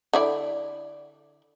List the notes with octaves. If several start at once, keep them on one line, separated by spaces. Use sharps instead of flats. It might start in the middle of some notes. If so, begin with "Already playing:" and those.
D3 E4 D5